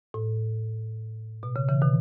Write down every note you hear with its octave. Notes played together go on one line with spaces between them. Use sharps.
A2
B2
C#3
C#3 E3
B2 D#3